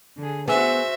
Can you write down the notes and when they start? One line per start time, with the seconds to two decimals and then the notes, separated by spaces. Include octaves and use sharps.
0.17 D3 G#4
0.48 B3 F#4 G#4 C5 E5 G#5 E6